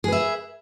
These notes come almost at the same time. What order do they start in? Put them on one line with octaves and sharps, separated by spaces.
G#4 B4 E5